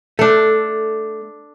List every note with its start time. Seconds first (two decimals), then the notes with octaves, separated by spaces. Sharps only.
0.19 A3 D4 A4